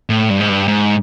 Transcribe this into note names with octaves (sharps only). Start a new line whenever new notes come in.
A2
G2
G#2
G2
G#2